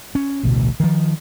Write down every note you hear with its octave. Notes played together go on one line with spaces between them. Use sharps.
C#4
A1 D2 B2
D#3 F3